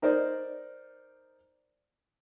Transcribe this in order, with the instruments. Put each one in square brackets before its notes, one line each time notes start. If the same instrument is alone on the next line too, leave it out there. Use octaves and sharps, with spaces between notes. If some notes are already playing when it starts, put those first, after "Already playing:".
[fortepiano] D#4 A#4 C5 D5 D#5